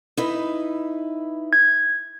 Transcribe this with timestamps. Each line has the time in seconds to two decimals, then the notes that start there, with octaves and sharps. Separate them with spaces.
0.17 D#4 E4 B4
1.53 G#6